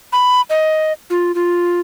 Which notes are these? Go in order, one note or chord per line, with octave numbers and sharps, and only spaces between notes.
B5
D#5
F4
F4